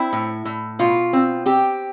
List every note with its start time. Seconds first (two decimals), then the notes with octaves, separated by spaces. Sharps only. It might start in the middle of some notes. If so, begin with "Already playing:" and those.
Already playing: C4 E4
0.13 A2
0.45 A2
0.79 B2 F4
1.13 C4
1.46 C4 G4